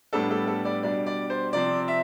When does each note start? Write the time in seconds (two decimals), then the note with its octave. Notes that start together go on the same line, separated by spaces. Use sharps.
0.13 A2 G3 B3 D4 A4
0.31 A4
0.47 A4
0.65 D5
0.83 B2 G3 D4 D5
1.06 D5
1.30 C5
1.53 C3 F3 C4 D5
1.88 E5